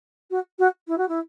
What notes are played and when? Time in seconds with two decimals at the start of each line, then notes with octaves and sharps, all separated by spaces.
0.31 F#4
0.59 F#4
0.88 E4
0.98 F#4
1.08 E4